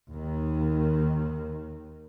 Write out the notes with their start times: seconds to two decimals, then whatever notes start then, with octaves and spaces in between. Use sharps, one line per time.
0.11 D#2 D#3